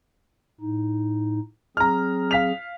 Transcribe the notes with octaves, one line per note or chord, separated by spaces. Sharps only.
A2 D#4
F#3 C4 G#4 A#5 F6
F5 B6 F7